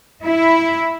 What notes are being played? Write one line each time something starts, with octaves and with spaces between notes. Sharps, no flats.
E4